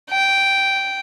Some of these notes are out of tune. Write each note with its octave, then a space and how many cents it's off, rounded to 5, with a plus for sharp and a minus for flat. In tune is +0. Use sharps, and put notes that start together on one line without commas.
G5 -5